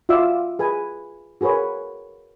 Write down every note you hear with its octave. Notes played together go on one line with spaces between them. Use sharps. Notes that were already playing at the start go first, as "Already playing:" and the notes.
F4 F#4 D5 E5 F5 E6
G#4 B4 G#5
F#4 G#4 A#4 B4 C#5